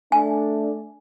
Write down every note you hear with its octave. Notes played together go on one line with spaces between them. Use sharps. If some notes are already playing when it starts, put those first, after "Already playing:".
A3 D4 G#5